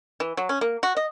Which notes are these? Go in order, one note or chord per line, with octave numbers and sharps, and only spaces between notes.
E3
F#3
C#4
A#3
F#4
D#5